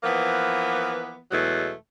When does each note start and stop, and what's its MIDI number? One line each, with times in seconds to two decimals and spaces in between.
0.04 1.19 52
0.04 1.19 53
0.04 1.19 58
0.04 1.19 59
1.31 1.72 40
1.31 1.72 47
1.31 1.72 54
1.31 1.72 56
1.31 1.72 57